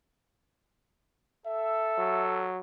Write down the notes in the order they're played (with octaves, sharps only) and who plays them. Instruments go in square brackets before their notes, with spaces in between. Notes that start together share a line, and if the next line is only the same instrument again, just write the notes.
[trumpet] A4 [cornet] E5
[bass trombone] F#3